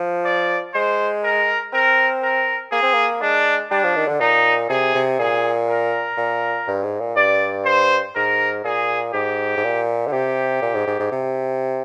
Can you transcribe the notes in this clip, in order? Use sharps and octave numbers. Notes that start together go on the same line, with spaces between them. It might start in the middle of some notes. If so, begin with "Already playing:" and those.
Already playing: F3
D5
G#3 C5
A#4
C4 A#4
A#4
A#3 G#4
C4
A#3
G#3 D4
G3 D4
F3
D#3
D3
A#2 D#4
C3 G#4
C3
A#2 G#4
A#4
A#2
G2
G#2
A#2
G2 D5
C5
G#2 A#4
A#2 G#4
G#2 G4
G#2
A#2
D3
C3 G4
A#2
G#2
G#2
G#2
C3